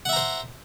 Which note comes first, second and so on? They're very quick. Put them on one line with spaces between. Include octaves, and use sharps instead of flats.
F#5 E5 A#5 C5